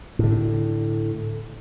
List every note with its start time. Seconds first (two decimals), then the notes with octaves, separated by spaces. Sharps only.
0.19 A2 D3